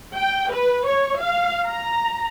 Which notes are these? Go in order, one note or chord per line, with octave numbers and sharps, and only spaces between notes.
G5
B4
C#5
F5
A#5